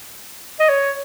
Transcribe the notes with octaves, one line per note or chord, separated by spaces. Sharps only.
D#5
C#5